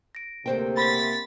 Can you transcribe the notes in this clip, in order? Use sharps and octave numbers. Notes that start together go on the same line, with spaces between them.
A#6 D7
D2 C3 A#3 C5 G5
F#5 B5 C6 A6 B6